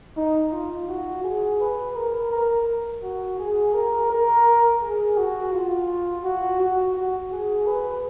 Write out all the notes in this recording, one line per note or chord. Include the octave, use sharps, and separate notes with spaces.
D#4
F4
F#4
G#4
B4
A#4
A#4
F#4
G#4
A#4
A#4
G#4
F#4
F4
F#4
F#4
F#4
G#4
B4